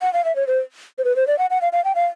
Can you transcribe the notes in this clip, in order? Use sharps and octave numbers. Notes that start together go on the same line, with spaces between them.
F#5
F5
E5
C#5
C5
C5
B4
C5
D5
F#5
F#5
F5
F5
G5
F5